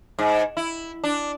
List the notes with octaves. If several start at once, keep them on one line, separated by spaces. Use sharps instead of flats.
G#2
E4
D4